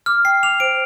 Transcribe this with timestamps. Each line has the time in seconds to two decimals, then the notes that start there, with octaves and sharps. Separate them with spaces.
0.06 D6 F6
0.25 G5 C7
0.43 D6 F7
0.60 C5 D7